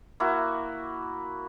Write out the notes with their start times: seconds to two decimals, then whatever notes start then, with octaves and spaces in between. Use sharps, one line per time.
0.20 A#3 E4 F#4